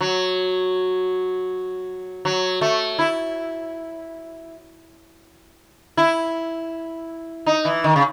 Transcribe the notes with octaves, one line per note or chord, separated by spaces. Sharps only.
F#3
F#3
A3
E4
E4
D#4
E3
D#3
C#3